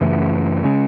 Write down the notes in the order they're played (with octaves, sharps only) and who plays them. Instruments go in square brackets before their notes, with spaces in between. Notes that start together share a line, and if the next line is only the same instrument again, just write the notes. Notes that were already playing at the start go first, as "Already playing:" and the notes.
[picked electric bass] F#2 C#3 E3 A3
C#3 G#3 C#4